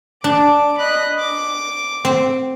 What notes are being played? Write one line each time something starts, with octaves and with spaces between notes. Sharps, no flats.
D4 D6
D#5 B5 F#6
D6
C4